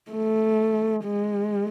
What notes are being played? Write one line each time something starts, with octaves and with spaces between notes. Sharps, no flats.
A3
G#3